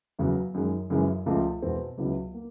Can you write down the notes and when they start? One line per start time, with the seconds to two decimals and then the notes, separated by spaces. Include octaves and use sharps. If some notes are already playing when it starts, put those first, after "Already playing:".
0.19 E2 C#3 F#3
0.54 F#2 D#3 G#3
0.90 F#2 C#3 E3 G#3
1.26 C#2 C#3 F3 A3
1.62 E2 B2 G#3 C4
1.98 C#2 C#3 F#3 B3 E4
2.34 A#3